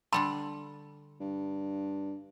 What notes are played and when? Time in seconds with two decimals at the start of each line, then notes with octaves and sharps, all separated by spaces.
0.13 D3 G3 A4 B5 C6
1.20 G2